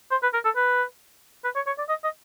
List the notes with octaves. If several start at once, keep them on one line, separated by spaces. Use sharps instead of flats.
C5
B4
A#4
A4
B4
B4
C#5
C#5
D5
D#5
D#5